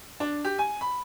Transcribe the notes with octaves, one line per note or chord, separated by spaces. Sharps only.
D4
G4
G#5
B5